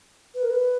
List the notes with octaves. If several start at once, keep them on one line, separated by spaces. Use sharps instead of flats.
B4
A#4
B4